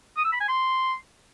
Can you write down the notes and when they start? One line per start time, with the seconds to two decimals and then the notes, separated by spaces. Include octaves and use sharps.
0.17 D#6
0.25 E6
0.33 B5
0.40 G#5
0.48 C6